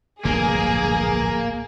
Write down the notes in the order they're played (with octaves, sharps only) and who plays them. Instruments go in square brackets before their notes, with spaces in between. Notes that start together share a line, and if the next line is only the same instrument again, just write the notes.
[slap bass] D1 A#1 G2 [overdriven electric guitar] A#3 [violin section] G#4